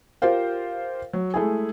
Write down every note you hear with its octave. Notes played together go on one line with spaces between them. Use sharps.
F4 G4 A#4 C5 F5
F#3
G#3 A3 E4 G#4